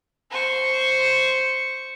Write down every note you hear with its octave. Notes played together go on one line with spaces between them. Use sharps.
C5 C#6